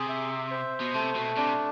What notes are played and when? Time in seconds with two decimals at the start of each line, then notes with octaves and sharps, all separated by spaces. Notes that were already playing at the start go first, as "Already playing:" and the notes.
Already playing: C3 G#4
0.09 E5
0.51 C5
0.80 B2
0.94 C3 A3
1.15 B2
1.37 C3 D4